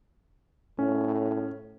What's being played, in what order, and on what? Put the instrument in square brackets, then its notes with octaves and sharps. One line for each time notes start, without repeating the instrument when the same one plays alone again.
[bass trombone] A2 [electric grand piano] C#4